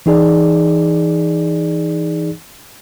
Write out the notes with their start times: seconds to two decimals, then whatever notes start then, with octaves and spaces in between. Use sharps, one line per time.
0.06 E3 D#4 G#4 D5